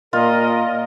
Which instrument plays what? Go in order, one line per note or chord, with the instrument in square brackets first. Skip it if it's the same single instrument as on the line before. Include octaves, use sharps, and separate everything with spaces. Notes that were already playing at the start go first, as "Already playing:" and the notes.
[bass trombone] A#2 [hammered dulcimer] F4 [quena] A#4 [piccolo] D#5